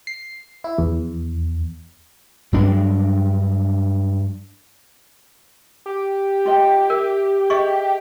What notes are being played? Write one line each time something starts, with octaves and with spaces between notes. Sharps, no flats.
C7
E4
E2
G2 F#3 G#3 D4
G4
F4 D#5 G5
A#4 E5
G#4 D#5 E5 C#6